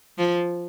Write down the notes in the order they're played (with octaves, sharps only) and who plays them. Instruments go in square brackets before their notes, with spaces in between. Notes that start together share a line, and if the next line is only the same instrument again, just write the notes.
[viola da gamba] F3